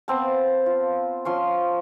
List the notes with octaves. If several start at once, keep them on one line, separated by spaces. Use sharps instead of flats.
B3 C4 F5 A5
F4
F3 C#4 C6